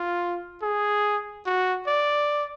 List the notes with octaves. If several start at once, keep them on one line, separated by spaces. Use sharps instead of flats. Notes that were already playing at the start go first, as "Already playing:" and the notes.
Already playing: F4
G#4
F#4
D5